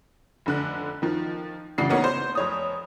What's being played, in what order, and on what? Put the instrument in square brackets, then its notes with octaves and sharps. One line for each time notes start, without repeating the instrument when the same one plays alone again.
[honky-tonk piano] F1 D3 F#6
D#3 F3
A1 C#3 D4 F#4 C7
A#3 B3 C#4 D#4
C5
F1 C#5 D#6